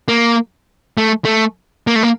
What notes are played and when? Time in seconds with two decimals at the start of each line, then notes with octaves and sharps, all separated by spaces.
0.08 A#3
0.98 A3
1.25 A3
1.87 A#3
1.96 A3
2.03 A#3